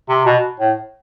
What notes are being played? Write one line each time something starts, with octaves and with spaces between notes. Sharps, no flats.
C3
B2
A2